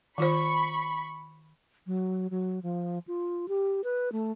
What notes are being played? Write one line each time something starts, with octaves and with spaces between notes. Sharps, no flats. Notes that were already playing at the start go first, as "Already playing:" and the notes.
D#3 F4 C5 B5 C#6
F#3
F#3
F3
F4
G4
B4
A3